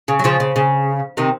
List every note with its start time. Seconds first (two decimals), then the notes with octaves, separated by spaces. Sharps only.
0.08 C#3
0.19 F#3
0.24 C#3 F3
0.40 C#3
0.56 C#3
1.17 C3 D#3